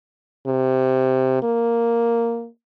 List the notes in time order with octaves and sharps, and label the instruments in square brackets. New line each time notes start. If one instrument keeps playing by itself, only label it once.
[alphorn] C3
A#3